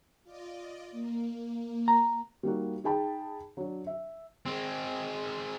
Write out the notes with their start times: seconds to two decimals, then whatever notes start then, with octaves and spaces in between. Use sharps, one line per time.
0.24 F4 D5 D#5
0.91 A#3
1.88 A#5
2.43 G3 A#3 D#4 F#4
2.84 D#4 G#4 G5 A5 B5
3.57 F#3 D4
3.87 E5
4.45 G#3 C4